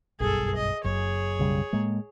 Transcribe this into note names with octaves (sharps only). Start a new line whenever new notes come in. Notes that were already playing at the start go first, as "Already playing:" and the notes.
F#1 B1 G2 G#4 A4
D#5
F#1 F#2 G#4 C#5
B1 C#3 G3
A2 G#3 A#3